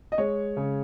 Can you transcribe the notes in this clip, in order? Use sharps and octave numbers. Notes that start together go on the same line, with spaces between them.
D#5
G#3 C#5
C#3